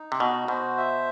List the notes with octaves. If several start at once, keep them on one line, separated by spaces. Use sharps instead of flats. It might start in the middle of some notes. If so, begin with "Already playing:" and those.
Already playing: D#4
C3
B2 F#4
B2 C5
E5